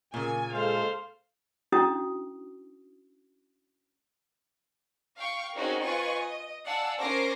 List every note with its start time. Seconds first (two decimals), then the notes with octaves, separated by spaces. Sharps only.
0.14 A#2 C#3 A#3 G#5
0.54 G#3 A4 C5 F5
1.72 C#4 D4 E4 F#4 D#6
5.18 F5 G5 C#6
5.54 C4 C#4 D#4 F#4 G#4 A#4
5.84 F4 B4 D#5 G#5 C#6
6.16 D#5
6.65 D5 F5 F#5 G#5 A5 E6
7.00 C#4 A#4 C5 D6 A#6 C7